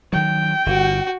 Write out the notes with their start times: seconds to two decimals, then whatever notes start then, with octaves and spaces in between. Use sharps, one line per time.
0.13 D#3 F#3 G5
0.66 G1 F#4